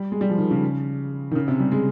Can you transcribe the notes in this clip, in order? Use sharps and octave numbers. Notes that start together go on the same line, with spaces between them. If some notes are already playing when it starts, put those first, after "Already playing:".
Already playing: G3
G#3
G3
F3
D#3
C#3
D#3
C#3
C3
G3
G#3